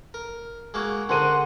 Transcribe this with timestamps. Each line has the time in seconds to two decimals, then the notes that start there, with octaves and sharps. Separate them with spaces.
0.14 A#4
0.74 G#3 A#3 F#4
1.09 D3 C4 G#4 A#4 F#5 C6 D#7